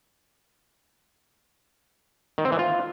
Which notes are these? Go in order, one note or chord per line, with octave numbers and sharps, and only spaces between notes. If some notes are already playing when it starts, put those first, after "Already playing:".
D#3
C4
E3
F4